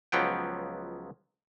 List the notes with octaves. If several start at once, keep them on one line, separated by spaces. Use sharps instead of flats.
C#2 F3 F#3 B3 G5